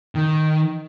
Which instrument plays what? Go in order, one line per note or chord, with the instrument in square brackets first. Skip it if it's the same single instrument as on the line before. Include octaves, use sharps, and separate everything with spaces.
[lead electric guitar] D#3